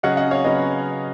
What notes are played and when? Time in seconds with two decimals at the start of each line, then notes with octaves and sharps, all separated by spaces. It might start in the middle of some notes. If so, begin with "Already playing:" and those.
0.03 C#3 F#3 C#4 D#5 F#5
0.17 D#5 F#5
0.31 C#5 F5
0.44 C#3 F#3 C#4 B4 D#5